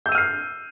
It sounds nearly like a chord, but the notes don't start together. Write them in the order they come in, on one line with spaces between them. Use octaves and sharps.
G6 E6 D#7 F6 C7